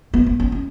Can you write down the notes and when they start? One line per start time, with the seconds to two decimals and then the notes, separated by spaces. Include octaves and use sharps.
0.14 B3
0.26 B3
0.40 C#4
0.52 C#4